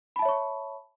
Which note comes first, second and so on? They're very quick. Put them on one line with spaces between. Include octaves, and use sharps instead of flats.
B5 A5 E5 C#5 C#6